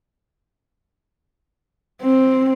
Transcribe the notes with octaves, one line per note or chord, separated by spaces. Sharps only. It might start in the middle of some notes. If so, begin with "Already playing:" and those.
C4